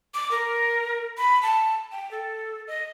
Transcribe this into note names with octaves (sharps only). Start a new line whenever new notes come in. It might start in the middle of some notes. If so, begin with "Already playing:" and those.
D6
A#4
B5
A5
G5
A4
D#5